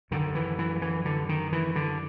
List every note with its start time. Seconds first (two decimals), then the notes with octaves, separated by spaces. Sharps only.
0.11 F#2 D3 D#3
0.35 E3
0.59 E3
0.82 E3
1.05 D3
1.29 D#3
1.52 E3
1.76 D3